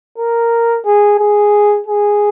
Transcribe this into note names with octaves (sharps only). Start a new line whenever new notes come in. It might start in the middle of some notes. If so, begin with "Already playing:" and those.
A#4
G#4
G#4
G#4